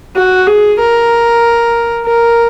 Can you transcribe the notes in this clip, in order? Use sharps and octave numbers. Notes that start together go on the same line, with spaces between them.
F#4
G#4
A#4
A#4